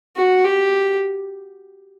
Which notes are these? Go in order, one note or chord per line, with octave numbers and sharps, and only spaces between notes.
F#4
G4